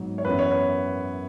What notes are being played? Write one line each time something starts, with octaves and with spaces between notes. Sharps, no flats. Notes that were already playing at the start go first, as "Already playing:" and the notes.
Already playing: G#2 F#3 B3
C#5
F#2 E3 B3 B4
C#5
B4